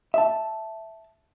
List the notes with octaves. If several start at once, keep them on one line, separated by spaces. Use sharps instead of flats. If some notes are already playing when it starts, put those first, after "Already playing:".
E5 A5